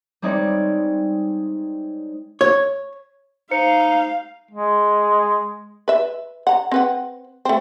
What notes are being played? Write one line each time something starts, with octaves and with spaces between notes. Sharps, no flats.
G3 G#3 C4 D#4 C#5 D5
C#5
D#4 C5 F5 C#7
G#3
B4 E5
F#5 A#5
C4 B4 F#5
A3 C4